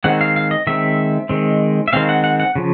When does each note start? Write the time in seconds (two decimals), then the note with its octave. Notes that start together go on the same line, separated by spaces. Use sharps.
0.04 D#3 G#3 C4 F#5
0.21 F5
0.36 F5
0.51 D#5
0.67 D#3 G#3 C4 E5
1.29 D#3 G#3 C4
1.88 E5
1.93 D#3 G#3 C4 F5
2.09 F#5
2.24 F#5
2.40 F#5
2.56 C#3 F3